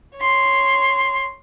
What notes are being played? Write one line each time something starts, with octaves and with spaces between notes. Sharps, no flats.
C#5 C6